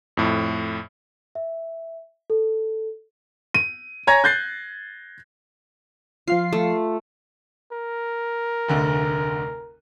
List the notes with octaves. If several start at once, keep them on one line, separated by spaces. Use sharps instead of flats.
F2 A2
E5
A4
D#7
C#5 G#5 A#5 G#6 A#6
F#6 G6 A6 C7
F3 F4 F5 C7
A3
A#4
F1 D2 D3